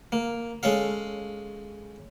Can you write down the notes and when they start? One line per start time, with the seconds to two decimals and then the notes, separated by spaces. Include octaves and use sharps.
0.12 A#3
0.63 G#3 C#4 A4 F5